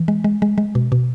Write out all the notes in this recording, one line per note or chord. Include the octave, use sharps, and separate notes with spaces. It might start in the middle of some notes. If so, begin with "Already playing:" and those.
Already playing: E3
G#3
G#3
G#3
G#3
B2
B2